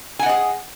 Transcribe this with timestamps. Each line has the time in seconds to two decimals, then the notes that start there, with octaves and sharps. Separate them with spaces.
0.19 G#5
0.23 F#5
0.26 D#5
0.29 G#4